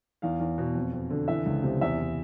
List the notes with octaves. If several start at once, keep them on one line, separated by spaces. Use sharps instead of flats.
E2 F5
E2
B2
F2
F2
D3
E3 E5
C#2
C3
E2 E5
E2